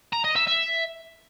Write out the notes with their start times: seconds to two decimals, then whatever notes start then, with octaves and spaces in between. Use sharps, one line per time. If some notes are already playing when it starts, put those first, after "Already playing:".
0.13 A#5
0.25 D#5
0.36 E5
0.47 E5